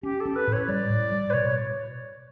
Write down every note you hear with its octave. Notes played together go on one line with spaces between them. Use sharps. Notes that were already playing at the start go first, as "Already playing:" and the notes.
C#4 G4
A4
C#4
B4
A2
C#5
G3 D5
A2
G3
B4
B2 C#5